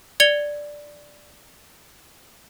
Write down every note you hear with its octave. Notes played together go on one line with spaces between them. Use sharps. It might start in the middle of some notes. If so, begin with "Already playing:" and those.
D5 G#6 C#7 F7 G7